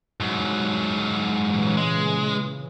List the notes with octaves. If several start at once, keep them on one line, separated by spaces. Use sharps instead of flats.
G#2 F#3
A#2 C#3 E3
G#3